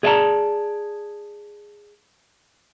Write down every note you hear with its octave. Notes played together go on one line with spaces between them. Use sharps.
G#4 D5 D#5 F5 A5 A#5